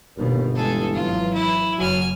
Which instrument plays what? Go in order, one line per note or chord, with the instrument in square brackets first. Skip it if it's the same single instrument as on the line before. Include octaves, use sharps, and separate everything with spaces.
[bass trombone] G1 [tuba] D#2 [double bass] B2 G3
[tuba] E3 [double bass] G#3 [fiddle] G#4 A4
[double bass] G#1 F#3 [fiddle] F4
[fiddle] E4
[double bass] F#1 [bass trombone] F#3 [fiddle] G#5 F6